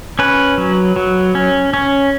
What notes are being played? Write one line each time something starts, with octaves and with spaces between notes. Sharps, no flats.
C#4 B4
F#3
F#3
C#4
C#4